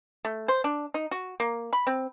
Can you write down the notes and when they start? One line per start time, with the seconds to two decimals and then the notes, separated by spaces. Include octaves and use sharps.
0.25 A3
0.48 C5
0.64 D4
0.94 D#4
1.11 F#4
1.40 A#3
1.73 B5
1.87 C4